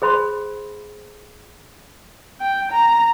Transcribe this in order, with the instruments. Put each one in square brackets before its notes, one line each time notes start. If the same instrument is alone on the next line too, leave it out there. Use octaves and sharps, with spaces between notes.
[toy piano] G#4 C5 B5 C6
[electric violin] G5
A#5